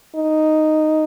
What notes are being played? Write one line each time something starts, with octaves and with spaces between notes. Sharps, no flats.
D#4